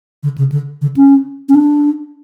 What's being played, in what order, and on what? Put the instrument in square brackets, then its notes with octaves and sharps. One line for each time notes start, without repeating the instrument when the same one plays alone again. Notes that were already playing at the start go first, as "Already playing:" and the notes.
[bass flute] D3
C#3
D3
D3
C#4
C#4
D4